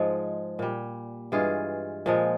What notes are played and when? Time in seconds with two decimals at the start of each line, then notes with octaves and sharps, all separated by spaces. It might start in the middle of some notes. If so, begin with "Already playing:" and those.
Already playing: G#2 F3 G#3
0.59 A#2 G3
1.32 G2 E3 G#3 F4 G#4
2.06 A#2 F3 G#3